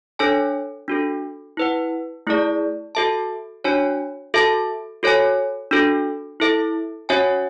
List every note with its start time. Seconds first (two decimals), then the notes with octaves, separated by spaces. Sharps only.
0.19 D4 A4 C#5 G#5
0.88 D4 F#4 A4
1.57 E4 B4 F#5
2.27 A3 E4 G#4 D5
2.95 F#4 A4 E5 A5
3.64 D4 F#4 C#5 G#5
4.34 F#4 A4 E5 A5
5.03 F#4 A4 C#5 G#5
5.71 D4 F#4 A4
6.40 E4 A4 E5
7.09 C#4 F#4 C#5 E5 G#5